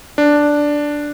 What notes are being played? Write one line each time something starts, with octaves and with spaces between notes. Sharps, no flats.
D4